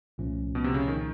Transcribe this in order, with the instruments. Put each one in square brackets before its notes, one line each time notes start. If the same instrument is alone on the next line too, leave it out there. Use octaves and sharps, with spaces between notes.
[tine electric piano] C2 A#2 F3 A3 C#4
[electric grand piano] B2
C3
C#3
D#3